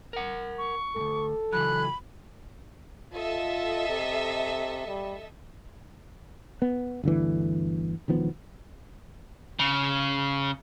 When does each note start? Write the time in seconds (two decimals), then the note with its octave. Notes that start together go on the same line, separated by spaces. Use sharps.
0.13 A#4 F#5
0.58 C#6
0.96 D2 G#2 A4
1.53 C#3 E3 F#3 B5 F#6
3.13 F4 A4 D#5 E5
3.89 C3
4.88 G3
6.62 B3
7.04 G1 D2 D3 E3
8.08 E1 D#3 F3 B3
9.59 C#3